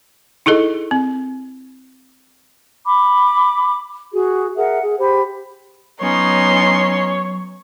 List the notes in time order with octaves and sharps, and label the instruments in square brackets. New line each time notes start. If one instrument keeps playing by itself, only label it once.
[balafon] D#4 E4 G#4 A4 D#5
C4
[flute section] B5 D6
F#4 G#4
G#4 A#4 E5 F#5
G#4
G4 C5 B5
[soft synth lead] F#3 [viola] B3 C#4 [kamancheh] D#4 C6 [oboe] C#5